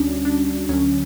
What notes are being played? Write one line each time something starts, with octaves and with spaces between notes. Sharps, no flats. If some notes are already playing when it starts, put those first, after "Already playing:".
Already playing: D2 D3 G3 C#4 D4 F#4
D4
D2 D3 F#3 C#4